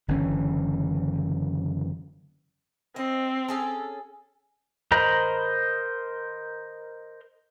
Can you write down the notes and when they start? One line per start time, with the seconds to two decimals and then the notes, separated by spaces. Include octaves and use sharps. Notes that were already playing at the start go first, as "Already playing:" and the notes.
0.08 F#1 D3 E3 C#4
2.96 C4 D#5
3.48 C#4 G#4 A4
4.92 A#4 C5 D#5 A#5 B5